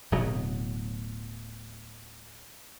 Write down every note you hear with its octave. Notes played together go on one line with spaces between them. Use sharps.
D1 B2 F#3